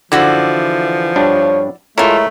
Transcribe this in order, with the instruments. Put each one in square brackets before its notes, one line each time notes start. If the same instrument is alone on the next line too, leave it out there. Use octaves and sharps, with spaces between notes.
[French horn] F#2 [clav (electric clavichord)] D3 [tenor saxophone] F3 [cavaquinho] E4 F#4 D5
[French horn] E3
[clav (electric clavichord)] G2 D4 [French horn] C#5
[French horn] G#3 [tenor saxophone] A3 [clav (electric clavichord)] E4 A#4 C#5 [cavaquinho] F4 A4